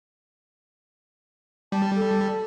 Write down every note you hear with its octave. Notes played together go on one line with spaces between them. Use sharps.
G3 A5
A4